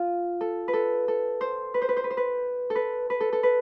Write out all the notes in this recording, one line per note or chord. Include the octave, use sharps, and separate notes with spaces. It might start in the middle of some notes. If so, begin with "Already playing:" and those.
Already playing: F4
A4
B4
A4
A4
C5
B4
C5
B4
C5
B4
C5
B4
A4
B4
B4
A4
A4
B4